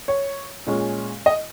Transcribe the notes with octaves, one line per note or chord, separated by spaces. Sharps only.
C#5
A#2 G#3 C#4
D#5